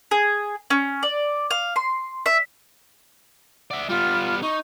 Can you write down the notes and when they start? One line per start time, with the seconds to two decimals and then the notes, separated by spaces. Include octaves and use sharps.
0.11 G#4
0.70 C#4
1.03 D5
1.51 F5
1.76 C6
2.26 E5
3.71 D5 E5 F#5
3.89 G3 B3 F4 F6
4.42 D#4 C#6